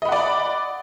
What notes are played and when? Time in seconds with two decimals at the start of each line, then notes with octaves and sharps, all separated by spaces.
0.02 D#5
0.05 B5
0.09 F#5
0.12 D5